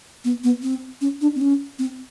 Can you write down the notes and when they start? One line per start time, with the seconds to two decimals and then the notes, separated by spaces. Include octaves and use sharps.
0.25 B3
0.44 B3
0.63 C4
1.01 C#4
1.21 D4
1.36 C4
1.41 C#4
1.79 C4